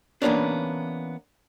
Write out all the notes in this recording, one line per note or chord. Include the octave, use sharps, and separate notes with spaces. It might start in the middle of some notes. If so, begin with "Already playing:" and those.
E3 A#3 B3 C#4 D4